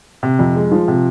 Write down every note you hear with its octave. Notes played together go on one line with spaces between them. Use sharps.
C3
F2
G#3
F3
C3